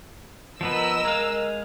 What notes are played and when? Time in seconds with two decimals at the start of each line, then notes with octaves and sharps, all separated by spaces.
0.61 F3 B3 A#4 B4 D#5 E6
1.05 G#3 F5